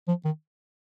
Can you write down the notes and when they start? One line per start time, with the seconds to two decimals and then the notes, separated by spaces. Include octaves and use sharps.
0.08 F3
0.25 D#3